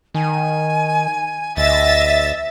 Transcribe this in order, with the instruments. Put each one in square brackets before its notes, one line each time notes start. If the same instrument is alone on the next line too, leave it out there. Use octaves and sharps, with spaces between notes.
[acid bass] D#3 [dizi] G#5
[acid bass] D2 [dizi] D#5 [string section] E5 A6